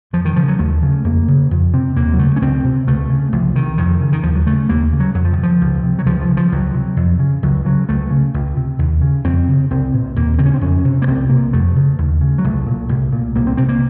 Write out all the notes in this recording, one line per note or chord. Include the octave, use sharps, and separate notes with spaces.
F2 F3
D#3
C#3 F3
F#3
D#2 A3
C#3
F2 A#3
C#3
F2
C3 C4
D#2 A#3
F#3
C#3 A3
C#4
C#2 C4
C3
C#2 A3
C#3
C2 F3
C3 D#3
F2 D#3
C#3
D#3
D#2 F3
F#3
C#3 A3
D#2 A#3
C#3
F#3
F2 F#3
F3
D#3
C3
F3
C#2
C3
F#3
C#2 F3
F3
C#3
F3
C#2 F#3
C3
F2
C#3
C#2 F#3
C#3 F#3
C#2 A3
C#3
C#2
C3
D#2
C#3
F2 C4
C#3
C2 C4
A#2
D#2 A#3
C#3 C4
C#4
C4
F2 C#4
C3
A#3
C2 C4
C3 A#3
F2 A3
C#3
D#2
C#3
F#3
C2 A3
A#2
C2
A#2
C2 A#3
C4
C3 C4
A#3